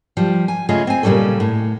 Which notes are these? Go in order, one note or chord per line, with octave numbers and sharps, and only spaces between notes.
F3 G3
G#5
C#3 A3 F4 G#4 D#5
C4 G#5
A#2 C#3 F3 G3 C#4 A4
A2